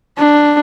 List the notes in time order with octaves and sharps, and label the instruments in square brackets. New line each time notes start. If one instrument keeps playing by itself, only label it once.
[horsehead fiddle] D4